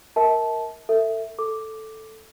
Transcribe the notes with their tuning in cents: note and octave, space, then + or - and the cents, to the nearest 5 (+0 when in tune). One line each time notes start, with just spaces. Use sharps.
A#4 +0 E5 -45 A5 -15
A4 +30 E5 +0
A4 +0 D6 +0